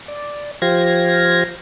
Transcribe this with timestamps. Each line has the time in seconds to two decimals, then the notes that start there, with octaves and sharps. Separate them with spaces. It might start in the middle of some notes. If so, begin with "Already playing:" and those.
0.08 D5
0.62 F3 G4 C5 F5 G#6 A#6